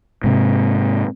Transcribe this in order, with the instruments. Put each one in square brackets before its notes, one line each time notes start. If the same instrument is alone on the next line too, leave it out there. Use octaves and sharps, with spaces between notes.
[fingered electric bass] G#2 C3